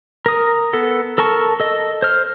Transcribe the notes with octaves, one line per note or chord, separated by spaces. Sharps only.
A#4 D#6
B3 A4
A4 A#4 A5 C#6
A4 D#5
C5 F6